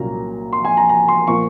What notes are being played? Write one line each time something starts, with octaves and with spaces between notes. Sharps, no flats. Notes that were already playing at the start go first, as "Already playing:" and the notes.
Already playing: C2 A#2 F#3 A#3 C#4 A#5
C6
G#5
A#5
A#5
C6
A#2 F3 A#3 C#6